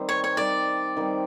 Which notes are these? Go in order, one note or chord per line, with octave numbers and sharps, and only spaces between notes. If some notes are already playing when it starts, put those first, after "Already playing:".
Already playing: D#3 G3 C4
C#5
C#5
D#3 G3 C4 D5
D#3 G3 C4